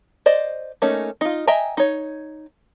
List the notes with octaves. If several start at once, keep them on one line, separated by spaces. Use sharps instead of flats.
C5 D5 D#5
A3 A#3 C#4 D#4
D#4 F4
D#5 E5 G5 G#5 A#5
D#4 C#5